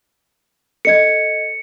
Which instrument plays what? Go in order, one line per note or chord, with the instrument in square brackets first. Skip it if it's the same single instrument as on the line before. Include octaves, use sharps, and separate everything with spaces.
[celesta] A4 D#5 G#6 [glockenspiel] C#7